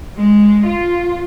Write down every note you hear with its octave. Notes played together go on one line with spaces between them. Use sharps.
G#3
F4